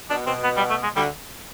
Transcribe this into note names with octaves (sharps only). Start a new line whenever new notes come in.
B2 D4
B2 C4
B3
G3
A3
G#3
D2 D3 G3